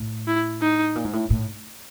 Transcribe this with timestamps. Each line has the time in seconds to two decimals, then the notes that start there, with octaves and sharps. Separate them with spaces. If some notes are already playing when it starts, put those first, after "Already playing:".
Already playing: A2
0.28 E4
0.62 D#4
0.95 A#2
1.05 G#2
1.13 A2
1.30 A2